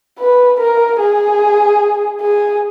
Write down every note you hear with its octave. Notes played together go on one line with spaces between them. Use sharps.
B4
A#4
G#4
G#4